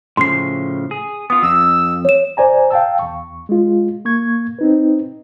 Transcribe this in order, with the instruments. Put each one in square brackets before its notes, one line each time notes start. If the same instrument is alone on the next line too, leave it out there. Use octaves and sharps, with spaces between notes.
[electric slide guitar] A2 C#3 F3 [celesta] C6 C7
[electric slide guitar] G#4
[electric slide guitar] B3 F4 [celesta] D#6
[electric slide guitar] F2 [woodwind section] E6
[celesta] C#5 E7
[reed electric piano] C#2 C5 D5 G#5 A#5
F5 G5 A5 E6
E2 C#6
G#3 F4
A#3 C#6 G#6
C4 D#4 B4